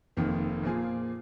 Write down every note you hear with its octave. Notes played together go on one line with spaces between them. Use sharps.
F1 F2 D#3 A#3
A#2 F3 A#3 F4 G#4